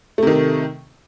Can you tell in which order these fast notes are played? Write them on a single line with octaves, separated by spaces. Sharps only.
A3 C3 D#3